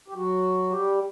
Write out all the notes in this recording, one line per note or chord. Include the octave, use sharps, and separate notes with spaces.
G4
F#3 F#4
G3 G4